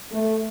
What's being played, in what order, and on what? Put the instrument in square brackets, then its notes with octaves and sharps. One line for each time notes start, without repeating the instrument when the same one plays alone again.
[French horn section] A3